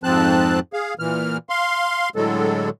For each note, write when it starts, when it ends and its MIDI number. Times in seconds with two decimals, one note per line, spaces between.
0.04 0.60 41
0.04 0.60 44
0.04 0.60 53
0.04 0.60 60
0.04 0.60 81
0.04 0.60 90
0.73 0.94 68
0.73 0.94 77
0.99 1.37 46
0.99 1.37 52
0.99 1.37 89
1.49 2.09 77
1.49 2.09 84
2.16 2.69 45
2.16 2.69 50
2.16 2.69 54
2.16 2.69 56
2.16 2.69 69